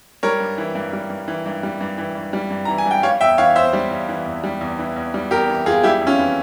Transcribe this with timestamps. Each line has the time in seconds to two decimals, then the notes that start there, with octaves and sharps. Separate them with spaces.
0.23 G3 A#4 C#5
0.40 G2
0.58 E3
0.75 G2
0.93 G3
1.10 G2
1.28 E3
1.46 G2
1.63 G3
1.81 G2
1.98 E3
2.15 G2
2.33 G3
2.51 G2
2.65 E3 A#5
2.78 G#5
2.86 G2 G5
3.03 G3 C#5 F5
3.20 E2 E5 G5
3.38 E3 C#5 F5
3.56 E2 C5 E5
3.73 G3
3.91 E2
4.09 E3
4.26 E2
4.44 G3
4.61 E2
4.79 E3
4.96 E2
5.14 G3
5.31 E2 G4 A#4
5.49 E3
5.66 E2 F4 G#4
5.83 G3 E4 G4
6.01 F2
6.06 C#4 F4
6.19 E3